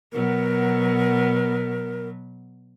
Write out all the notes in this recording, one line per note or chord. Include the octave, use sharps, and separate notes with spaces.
B2 F#3 B3 A#4